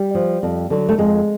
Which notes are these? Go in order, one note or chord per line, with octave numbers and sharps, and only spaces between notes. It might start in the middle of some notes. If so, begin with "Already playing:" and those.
Already playing: G3
F3
F2
D3 F#3
A3
F2 G#3